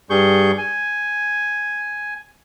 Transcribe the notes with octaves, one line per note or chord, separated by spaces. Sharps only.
G2 G3 G#4 C#6 G6
G#5